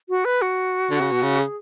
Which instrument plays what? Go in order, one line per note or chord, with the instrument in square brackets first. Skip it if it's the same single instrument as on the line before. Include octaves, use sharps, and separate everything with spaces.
[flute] F#4
B4
F#4
[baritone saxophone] D3
C#3
B2
C#3
[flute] G#4